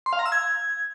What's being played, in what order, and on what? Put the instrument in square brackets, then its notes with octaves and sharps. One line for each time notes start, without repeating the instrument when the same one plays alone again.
[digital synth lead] C6
F5
A#5
E6
G#6